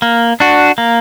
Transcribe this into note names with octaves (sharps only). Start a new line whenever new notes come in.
A#3
D4 F#4
A#3